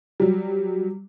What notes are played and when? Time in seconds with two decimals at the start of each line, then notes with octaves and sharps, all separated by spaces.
0.20 F#3 G3